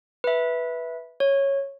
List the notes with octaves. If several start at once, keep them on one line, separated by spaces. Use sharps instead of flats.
B4 E5
C#5